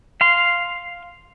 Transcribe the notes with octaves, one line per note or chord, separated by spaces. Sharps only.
F5 C6